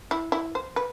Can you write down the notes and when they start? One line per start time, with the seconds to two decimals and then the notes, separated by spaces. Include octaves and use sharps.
0.11 E4
0.32 E4
0.55 C5
0.76 B4